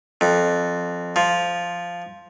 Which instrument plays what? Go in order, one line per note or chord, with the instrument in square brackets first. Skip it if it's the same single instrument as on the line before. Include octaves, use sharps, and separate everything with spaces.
[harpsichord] F2
F3